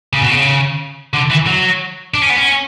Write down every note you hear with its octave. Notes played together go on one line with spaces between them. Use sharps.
C#3
B2
C#3
D3
E3
F#3
D4
C#4
B3
C#4